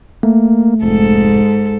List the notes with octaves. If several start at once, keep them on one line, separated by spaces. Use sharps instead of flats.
A3 A#3
F1 G#2 A4